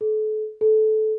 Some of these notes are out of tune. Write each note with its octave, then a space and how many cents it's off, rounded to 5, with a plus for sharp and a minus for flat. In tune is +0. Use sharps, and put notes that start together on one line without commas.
A4 -35
A4 -20